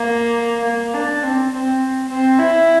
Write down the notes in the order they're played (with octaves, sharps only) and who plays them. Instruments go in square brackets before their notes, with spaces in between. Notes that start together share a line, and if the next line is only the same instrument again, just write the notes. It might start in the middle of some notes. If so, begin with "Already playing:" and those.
Already playing: [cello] A#3
A#3
D4
C4
C4
C4
E4